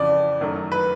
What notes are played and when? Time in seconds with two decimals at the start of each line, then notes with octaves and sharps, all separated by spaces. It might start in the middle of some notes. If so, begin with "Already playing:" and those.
Already playing: F2 C#3 E3 D5
0.41 F#2 D#3 F#3 A3
0.72 B4